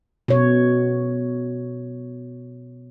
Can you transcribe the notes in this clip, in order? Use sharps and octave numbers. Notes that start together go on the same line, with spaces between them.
B2 C#5